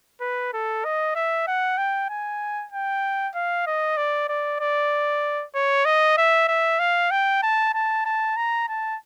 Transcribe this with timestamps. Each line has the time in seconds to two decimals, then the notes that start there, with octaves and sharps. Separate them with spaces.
0.21 B4
0.53 A4
0.84 D#5
1.15 E5
1.47 F#5
1.77 G5
2.09 G#5
2.72 G5
3.35 F5
3.67 D#5
3.97 D5
4.29 D5
4.60 D5
5.55 C#5
5.85 D#5
6.17 E5
6.48 E5
6.79 F5
7.11 G5
7.43 A5
7.74 A5
8.05 A5
8.36 A#5
8.68 A5